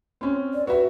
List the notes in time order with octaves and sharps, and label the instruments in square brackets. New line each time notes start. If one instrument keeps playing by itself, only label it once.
[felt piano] C4 C#4
[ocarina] D5
[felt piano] F#4 E5 [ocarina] B4